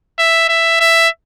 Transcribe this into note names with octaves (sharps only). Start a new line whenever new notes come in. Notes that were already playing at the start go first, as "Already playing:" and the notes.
E5
E5
E5